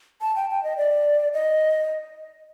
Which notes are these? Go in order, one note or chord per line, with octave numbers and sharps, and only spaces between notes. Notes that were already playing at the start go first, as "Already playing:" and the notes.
A5
G5
G5
D#5
D5
D#5